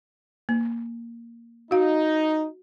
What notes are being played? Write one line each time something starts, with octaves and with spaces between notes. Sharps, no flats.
A#3
D#4 F#4 F5